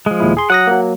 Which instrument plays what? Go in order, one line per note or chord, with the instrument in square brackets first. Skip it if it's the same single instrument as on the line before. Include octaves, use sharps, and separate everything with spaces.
[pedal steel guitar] F3 G#3
[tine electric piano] D#2 A#2 E4
G#4 C6
[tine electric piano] F#3 D#6 A#6 [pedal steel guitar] F#5
[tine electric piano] F#3 A#3